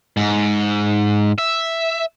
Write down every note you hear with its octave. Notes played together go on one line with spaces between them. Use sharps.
G#2
E5